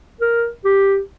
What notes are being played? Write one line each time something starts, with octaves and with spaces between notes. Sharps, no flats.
A#4
G4